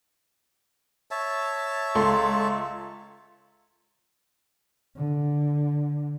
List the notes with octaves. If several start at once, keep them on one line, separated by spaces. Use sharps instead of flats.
C#5 E5 A5
C#2 A4 C6
D3